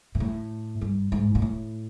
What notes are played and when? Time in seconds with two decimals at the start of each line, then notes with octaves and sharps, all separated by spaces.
0.15 A#2
0.20 A2
0.81 G2
1.12 G#2
1.35 A#2
1.42 A2